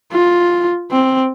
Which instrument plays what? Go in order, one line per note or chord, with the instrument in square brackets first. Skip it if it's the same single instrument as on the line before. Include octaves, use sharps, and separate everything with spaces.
[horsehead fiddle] F4
C4